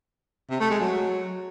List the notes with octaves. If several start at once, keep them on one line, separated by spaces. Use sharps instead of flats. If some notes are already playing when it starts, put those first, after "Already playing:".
C3
A3
G#3
F#3